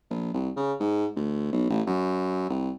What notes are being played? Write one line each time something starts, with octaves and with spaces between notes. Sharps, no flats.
A#1
C2
C#3
G#2
D2
B1
A1
F#2
C2